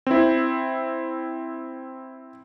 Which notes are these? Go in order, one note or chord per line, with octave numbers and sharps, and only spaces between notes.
C4 E4